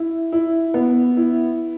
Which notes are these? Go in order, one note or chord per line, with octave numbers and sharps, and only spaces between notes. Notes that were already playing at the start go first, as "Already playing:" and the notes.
Already playing: E4
E4
B3
E4